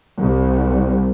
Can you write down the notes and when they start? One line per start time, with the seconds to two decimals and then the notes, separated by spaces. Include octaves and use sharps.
0.18 C2